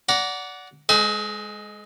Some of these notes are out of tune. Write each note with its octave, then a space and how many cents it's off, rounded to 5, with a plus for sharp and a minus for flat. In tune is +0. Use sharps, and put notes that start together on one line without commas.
D5 -25 F#5 +0 A#5 +5
G#3 +0 G#4 +40 C5 -45